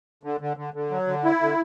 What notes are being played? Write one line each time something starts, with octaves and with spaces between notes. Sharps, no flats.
D3
D3
D3
D3
F#3
D3
E4
D3